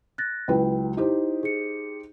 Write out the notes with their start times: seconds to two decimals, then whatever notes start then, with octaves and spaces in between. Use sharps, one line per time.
0.18 F#6 A6 A#6
0.48 C#2 F#3 E4 B4 G5
0.97 D#4 E4 G4 C5
1.43 G#4 C#7